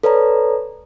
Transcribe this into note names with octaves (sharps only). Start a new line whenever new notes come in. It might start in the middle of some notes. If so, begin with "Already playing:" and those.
A4 B4 C#5 D5 A#5